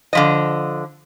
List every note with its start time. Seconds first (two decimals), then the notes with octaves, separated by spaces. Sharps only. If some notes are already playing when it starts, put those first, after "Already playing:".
0.13 D3 F3 D#5